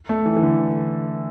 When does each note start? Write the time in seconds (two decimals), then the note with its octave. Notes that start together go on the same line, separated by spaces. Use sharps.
0.09 A3
0.26 E3
0.37 E3
0.43 D3